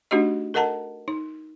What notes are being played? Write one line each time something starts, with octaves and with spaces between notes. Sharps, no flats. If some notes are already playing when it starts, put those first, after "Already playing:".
A3 D4 D#4 F#4 G4 D#5
A4 A#4 D#5 F#5 A5 A#5
D#4